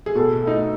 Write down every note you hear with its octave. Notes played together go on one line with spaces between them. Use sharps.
G#4
B2 A4
A3 D#4